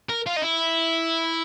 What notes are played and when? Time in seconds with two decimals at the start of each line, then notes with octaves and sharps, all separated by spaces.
0.09 A#4
0.26 F4
0.36 D#4
0.42 E4